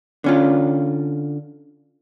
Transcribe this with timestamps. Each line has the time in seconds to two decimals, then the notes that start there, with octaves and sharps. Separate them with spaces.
0.24 D3 C#4 F4